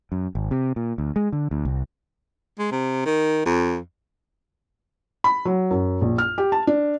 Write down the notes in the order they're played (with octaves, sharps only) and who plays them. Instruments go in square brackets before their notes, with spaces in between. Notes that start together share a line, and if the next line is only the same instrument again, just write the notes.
[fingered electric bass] F#2
G#1
C3
A#2
D2
G#3
D3
D2
C2
[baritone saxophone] G#3
C3
D#3
F2
[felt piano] B5
F#3
F#2
A#1
F6
G4
A5
D4